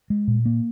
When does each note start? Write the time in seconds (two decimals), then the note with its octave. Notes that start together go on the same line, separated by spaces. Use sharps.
0.10 G#3
0.28 A#2
0.46 A#3